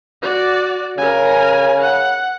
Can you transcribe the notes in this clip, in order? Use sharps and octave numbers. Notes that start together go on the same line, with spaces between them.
F#4 D5
C#3 A#4 G#5
F#5